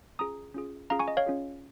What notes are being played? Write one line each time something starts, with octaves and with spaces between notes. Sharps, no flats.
C#4 F4 G#4 A#5 D#6
C#4 F4 G#4
C#4 F4 G#4 F5 A#5
G#5 C#6
D#5
C#5 F5
C#4 F4 G#4